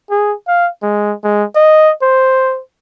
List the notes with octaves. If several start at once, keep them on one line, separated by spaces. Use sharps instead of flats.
G#4
F5
G#3
G#3
D#5
C5